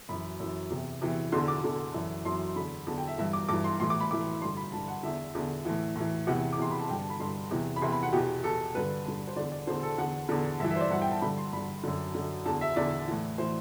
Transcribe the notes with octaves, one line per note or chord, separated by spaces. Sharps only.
F#2 E3 B5
F#2 E3
E2 C3 E3
E2 C3 E3
E2 D3 C6
D6
E2 D3
F#2 E3
F#2 E3 C6
E2 D3 B5
E2 D3 A5
G5
E5
G2 E3 E5
D6
G2 E3 D6
C6
A2 E3 C6
D6
B5
A2 E3 D6
G2 D3 C6
B5
G2 D3 A5
F#5
E2 D3 E5
E2 D3
A2 E3
A2 E3
E2 C3 E3 F#5
D6
E2 C3 E3 C6
B5
A5
G2 D3 G5
A5
B5
G2 D3 C6
E2 C3 E3
B5
E2 C3 E3 C6
B5
F#5
E2 B2 G4
E2 B2 A4
G2 D3 B4
G2 D3
C5
E2 D3 D5
D5
E2 D3 C5
A4
E2 D3 F#5
E2 D3
G2 E3 E5
E5
C5
D5
G2 E3 F#5
G5
A5
G2 D3 B5
C6
G2 D3 B5
F#2 D3
F#2 D3
E2 D3 A5
E5
E2 D3 D5
A2 E3
A2 E3 C5